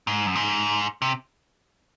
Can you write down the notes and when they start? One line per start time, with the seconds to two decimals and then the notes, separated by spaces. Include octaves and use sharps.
0.07 G#2
0.26 F#2
0.35 G#2
1.02 C3